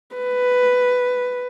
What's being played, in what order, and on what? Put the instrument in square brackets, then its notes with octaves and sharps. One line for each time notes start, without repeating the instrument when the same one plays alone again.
[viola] B4